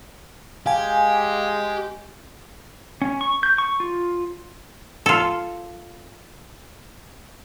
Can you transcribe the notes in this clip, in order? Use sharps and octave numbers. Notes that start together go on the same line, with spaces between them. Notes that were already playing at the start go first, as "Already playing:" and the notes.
G#3 G4 F5 G#5
C#4
C#6
G6
C#6
F4
F4 A4